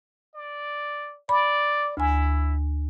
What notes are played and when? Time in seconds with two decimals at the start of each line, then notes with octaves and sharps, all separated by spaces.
0.34 D5
1.29 D5 B5
1.97 D2 E4 G#5